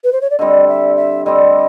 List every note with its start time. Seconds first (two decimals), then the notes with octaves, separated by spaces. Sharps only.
0.04 B4
0.12 C5
0.21 C#5
0.30 D5
0.39 D3 G3 C4 D#5
0.68 E5
0.96 E5
1.25 D3 G3 C4 D#5